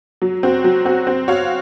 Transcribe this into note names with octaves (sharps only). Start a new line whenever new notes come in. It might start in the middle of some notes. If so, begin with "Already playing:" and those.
F#3
C4 F#4
F#3
C4 F#4
C4
F#4 C#5 F5